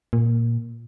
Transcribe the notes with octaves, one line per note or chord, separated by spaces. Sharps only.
A#2